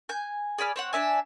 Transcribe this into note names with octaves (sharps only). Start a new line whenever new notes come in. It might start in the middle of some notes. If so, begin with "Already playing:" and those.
G#5 G6
G#4 D5 B5 F6
C4 C#5 F#5
D4 E5 G#5